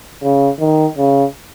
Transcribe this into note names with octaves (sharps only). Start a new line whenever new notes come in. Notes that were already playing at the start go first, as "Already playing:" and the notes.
C#3
D#3
C#3